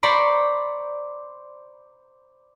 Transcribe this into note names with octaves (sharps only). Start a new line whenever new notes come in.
C5 D5 A#5 B5 C#6 D6